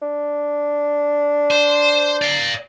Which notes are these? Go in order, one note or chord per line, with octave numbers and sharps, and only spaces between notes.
D4
C5
D5 F5